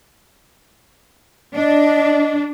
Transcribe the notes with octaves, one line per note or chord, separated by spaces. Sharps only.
D4 D#5